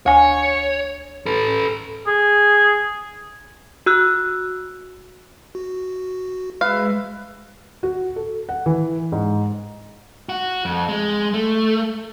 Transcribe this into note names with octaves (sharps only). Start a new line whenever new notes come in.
D2 C#5 G#5
A4 B4
G#4
F#4 E6 F#6
F#4
G#3 B4 E5 F5
F#4
A4
F#5
E3
G#2
F#4
F2
G#3
A3